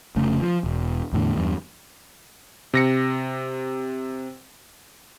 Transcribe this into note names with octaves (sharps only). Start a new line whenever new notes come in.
F1 C#3 A3
F3
E1
E2 A2 D3
E2 G2
C3 A#6 C#7